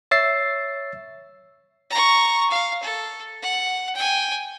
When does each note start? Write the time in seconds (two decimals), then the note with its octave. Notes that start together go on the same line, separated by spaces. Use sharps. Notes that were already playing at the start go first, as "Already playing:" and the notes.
0.11 C#5 E5 E6 A6 C7
1.90 A#5 C#6
2.50 F5
2.83 A4
3.42 F#5
3.95 G5 G#5